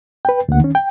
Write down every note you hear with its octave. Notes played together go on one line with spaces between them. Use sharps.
B4 G5
D2 A#3 F#5
D#3 C#4
G5